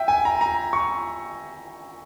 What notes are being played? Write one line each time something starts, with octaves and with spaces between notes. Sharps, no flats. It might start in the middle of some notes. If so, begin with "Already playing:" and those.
Already playing: E5 G5
G#5
A#5
A#5
C#6